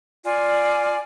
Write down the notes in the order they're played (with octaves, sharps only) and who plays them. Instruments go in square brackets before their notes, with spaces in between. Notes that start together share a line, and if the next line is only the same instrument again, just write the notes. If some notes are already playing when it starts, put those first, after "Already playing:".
[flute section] F4 D5 G#5